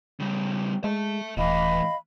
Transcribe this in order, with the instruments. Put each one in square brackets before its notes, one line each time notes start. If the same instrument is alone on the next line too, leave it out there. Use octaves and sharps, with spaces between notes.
[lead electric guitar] C#3 G3
[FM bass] G#3 [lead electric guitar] E5 A5
[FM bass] D#1 [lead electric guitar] A2 E3 [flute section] D#5 F5 B5